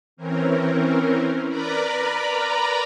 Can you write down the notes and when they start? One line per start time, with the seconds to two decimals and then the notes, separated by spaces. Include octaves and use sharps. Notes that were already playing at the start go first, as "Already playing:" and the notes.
0.17 E3 C4 C#4 A#4
1.47 A#4 B4 D5 A#5 B5